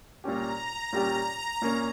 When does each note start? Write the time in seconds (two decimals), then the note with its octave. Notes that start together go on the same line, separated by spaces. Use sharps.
0.24 A#2 G3 C#4 G4 A#5
0.93 A#2 G3 C#4 G4
1.62 A#2 A#3 C#4